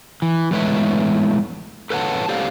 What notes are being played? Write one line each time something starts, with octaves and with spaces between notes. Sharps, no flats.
E3
E2 A2 G#3 B4 C#5 E5
A4 B4 C#5 E5 F#5 A5
G4 A4 C5 D5 F5